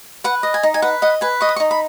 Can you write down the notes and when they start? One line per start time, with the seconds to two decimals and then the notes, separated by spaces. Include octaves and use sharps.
0.24 B4 F#5
0.43 D#5
0.54 G#5
0.63 D#4
0.74 G#5
0.82 B4 F#5
1.02 D#5 F#5
1.21 B4 G#5
1.40 D#5 C#6
1.49 D#6
1.56 C#6
1.60 D#4
1.71 B5